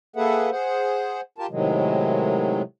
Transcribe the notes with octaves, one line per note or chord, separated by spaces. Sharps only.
A#3 G#4 A4 B4 E5 F#5
G#4 C5 F#5
F4 G4 A#4 A5
A2 C3 D#3 F#3 G#3